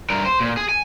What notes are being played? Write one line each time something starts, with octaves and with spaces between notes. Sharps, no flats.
G2 A#4
C5
A#2
G#4
G#5